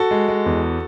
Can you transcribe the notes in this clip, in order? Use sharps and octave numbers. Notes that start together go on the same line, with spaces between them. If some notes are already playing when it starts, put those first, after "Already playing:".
Already playing: F#4 A4
G#3
G#3
E2